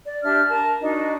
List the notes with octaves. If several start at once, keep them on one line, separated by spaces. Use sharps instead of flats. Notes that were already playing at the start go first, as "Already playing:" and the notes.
D5
D4 G4 E5 F6
A#4 A5
D4 D#4 F#4 D#5